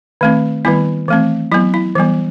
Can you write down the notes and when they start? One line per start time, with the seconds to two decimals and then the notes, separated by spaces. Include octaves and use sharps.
0.21 D#3 A3 C4
0.65 D#3 G3 B3 E4
1.08 E3 A3 C4
1.52 F#3 B3 E4
1.74 E4
1.95 E3 G3 B3